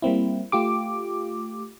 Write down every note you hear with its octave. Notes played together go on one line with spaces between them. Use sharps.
G3 A#3 C4 E4
A3 F4 G4 D6